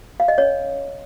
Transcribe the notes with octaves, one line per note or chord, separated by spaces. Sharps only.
F5
D#5
C#4 C#5